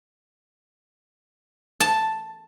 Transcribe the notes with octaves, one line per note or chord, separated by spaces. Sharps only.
A5